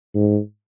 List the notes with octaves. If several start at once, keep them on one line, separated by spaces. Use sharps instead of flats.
G#2